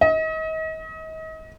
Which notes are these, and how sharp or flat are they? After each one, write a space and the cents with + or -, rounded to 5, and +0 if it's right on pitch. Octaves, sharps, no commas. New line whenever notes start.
D#5 +35